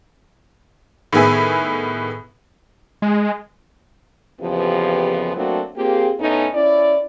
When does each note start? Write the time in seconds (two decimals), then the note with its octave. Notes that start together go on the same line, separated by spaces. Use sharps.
1.13 A2 D#3 B3 G#4 E5 G#5
3.02 G#3
4.40 F2 C#3 E3 F3 B3 G4
5.35 F#3 A3 A#3 C4 D4 F#4
5.76 A#3 C4 F4 G4 G#4
6.19 A2 A3 B3 C#4 D#4
6.54 C#4 E4 D5